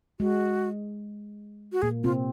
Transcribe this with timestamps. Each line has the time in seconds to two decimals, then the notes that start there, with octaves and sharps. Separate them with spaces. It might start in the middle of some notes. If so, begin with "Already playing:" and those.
0.20 G#3 F#4
1.72 F#4
1.82 A#2 A#3 G#4
2.04 C3 C4 F4